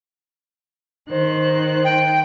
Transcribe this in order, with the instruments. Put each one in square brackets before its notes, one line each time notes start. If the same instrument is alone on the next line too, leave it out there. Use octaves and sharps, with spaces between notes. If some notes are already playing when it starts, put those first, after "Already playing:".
[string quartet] D#3 C5 F#6
[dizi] G5